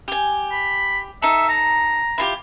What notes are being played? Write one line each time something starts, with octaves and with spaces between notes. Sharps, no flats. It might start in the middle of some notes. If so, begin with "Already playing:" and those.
G4 G#5
B5
D#4 A4 E5
A#5
E4 F4 G4